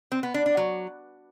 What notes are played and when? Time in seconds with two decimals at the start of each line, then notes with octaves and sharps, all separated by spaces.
0.12 C4
0.23 B3
0.34 D4
0.46 D4
0.57 F#3